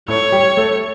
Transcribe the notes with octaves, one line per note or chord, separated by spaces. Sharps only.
A2 A3 C#5
G3 G4
A3 A4